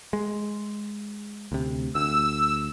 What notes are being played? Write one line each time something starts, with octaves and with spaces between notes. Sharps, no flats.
G#3
D2 C3
D2 E6